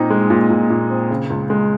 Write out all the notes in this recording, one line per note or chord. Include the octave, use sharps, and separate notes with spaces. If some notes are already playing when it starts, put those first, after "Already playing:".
Already playing: A#2 C4 D#4
G#3
A#2
A#2
A#2
C4
C#3
C#2
G#3